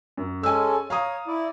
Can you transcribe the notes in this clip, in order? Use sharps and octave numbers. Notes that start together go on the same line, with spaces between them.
F#2
G#3 C#4 A4 G#5 E6
C#5 F5 A#5 D#6
E4 D5